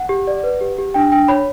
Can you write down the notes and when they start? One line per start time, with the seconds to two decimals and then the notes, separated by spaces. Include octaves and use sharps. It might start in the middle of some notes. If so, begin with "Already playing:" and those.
Already playing: F#5
0.09 G4
0.27 D5
0.43 B4
0.61 G4
0.78 G4
0.94 D4 G5
1.12 D4 G5
1.28 C#5 B5